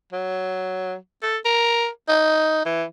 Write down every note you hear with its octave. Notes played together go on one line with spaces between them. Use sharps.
F#3
A4
A#4
D#4
E3